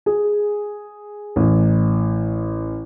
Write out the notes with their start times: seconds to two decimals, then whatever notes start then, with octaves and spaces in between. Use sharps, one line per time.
0.06 G#4
1.36 A1